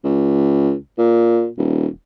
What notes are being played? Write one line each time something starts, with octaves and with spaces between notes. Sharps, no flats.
C#2
A#2
D#1